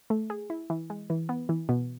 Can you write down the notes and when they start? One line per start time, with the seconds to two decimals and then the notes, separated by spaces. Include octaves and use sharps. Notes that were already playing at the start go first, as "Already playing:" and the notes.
0.10 A3
0.30 G#4
0.50 E4
0.70 E3
0.90 G#3
1.10 E3
1.29 B3
1.49 E3
1.69 B2